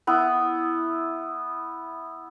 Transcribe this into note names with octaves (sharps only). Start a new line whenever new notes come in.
B3 E4